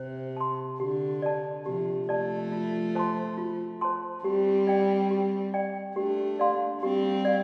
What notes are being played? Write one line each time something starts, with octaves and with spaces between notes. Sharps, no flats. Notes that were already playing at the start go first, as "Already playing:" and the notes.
Already playing: C3 C5
A5 C6
D3 G4
D5 A5
C3 F3 G4
F3 A3 D5 A5
F4
C5 A5 C6
F4
C5 A5 C6
G3 C4 G4
D5 G5
G4
D5 G5
A3 D4 G4
D5 F5 C6
G3 C4 G4
D5 F5